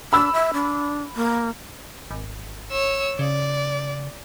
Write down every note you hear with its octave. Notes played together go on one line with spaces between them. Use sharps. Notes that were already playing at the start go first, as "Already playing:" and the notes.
D4 B5 E6
E5
D4
A#3
G#1
C#5 E6
C#3 D5